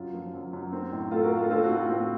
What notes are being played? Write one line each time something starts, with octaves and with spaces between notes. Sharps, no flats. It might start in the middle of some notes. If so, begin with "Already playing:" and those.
Already playing: F#2 F4
F3
F#2
F#2
C4
A2
A3 F4 A4
F#4 A#4
A3
F4 A4
C4 F4 A4
F#4
A2
F4
C4 F#4